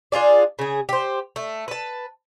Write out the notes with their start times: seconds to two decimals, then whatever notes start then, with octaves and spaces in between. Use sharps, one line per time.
0.12 D4 F4 G#4 D5
0.59 C#3 G#4
0.89 G4 C5
1.36 A3
1.68 B4 A5